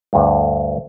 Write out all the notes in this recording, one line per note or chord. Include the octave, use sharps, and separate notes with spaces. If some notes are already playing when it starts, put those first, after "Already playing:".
D2 G2